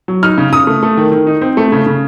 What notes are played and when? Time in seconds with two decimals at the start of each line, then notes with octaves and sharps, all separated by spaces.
0.08 F#3
0.23 D#4 F6
0.38 C#3
0.52 C#3 D#6
0.67 A3
0.83 A3
0.97 D#3
1.12 D#3
1.27 D#4
1.41 C4
1.57 A3
1.72 C#3
1.86 C#3